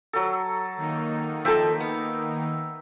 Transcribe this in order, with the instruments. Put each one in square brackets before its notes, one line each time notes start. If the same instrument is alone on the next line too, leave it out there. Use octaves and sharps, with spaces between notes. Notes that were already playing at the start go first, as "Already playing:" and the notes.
[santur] F#3 A4
[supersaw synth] D#3 A#3 D#4
[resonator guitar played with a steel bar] F3 A4 [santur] E5 G5 A#5
[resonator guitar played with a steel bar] B3